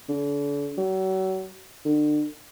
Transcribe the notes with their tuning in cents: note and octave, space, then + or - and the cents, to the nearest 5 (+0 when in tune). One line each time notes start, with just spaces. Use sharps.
D3 -40
F#3 +35
D3 +35